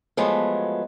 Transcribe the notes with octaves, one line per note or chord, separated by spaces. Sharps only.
F3 F#3 G#3 A3 B3